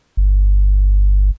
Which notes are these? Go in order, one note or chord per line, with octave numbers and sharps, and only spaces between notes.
G1